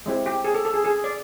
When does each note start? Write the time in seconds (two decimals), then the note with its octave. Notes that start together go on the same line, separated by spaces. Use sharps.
0.06 G#3 C4 E4 G4
0.26 G4
0.44 G#4
0.54 A4
0.65 A4
0.74 G#4
0.84 G#4
1.04 D5